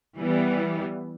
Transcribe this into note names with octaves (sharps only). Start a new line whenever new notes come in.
E3 G3 B3